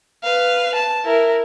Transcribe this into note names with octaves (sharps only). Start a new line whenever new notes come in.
B4 F5
A5
E4 A#4